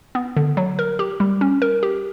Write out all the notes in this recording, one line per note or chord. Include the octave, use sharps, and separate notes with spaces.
B3
D3
F#3
A#4
G4
G3
C#4
A#4
G4